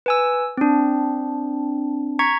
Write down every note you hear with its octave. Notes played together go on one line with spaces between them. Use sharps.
B4 G#5 E6
C4 D4
A#5 C#6 G#6 B6 C#7